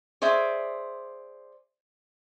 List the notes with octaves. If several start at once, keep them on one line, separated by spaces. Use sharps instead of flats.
G#4 C5 D5 E5